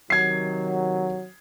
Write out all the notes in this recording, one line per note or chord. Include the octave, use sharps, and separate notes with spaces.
C3 D#3 F#3 G#6 C7